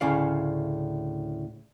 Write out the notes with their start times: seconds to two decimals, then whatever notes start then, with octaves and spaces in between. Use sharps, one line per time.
0.01 D2 A2 C#3 D5 F5